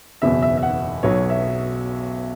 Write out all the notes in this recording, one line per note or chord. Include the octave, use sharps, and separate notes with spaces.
F#1 E2 B2 E5
E5
E5
F#5
B1 B2 F#3 B3 C#5
E5